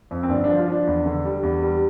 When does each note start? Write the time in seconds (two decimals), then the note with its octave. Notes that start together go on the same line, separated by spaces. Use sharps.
0.11 F2
0.23 C4
0.29 G1 D4
0.44 F3 D4
0.58 F4
0.68 F3 D4
0.87 E2
1.05 D3
1.25 G3
1.43 E2
1.63 G3